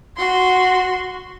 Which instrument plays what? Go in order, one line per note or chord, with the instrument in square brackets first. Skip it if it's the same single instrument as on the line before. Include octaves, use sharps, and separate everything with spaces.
[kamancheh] F#4 C6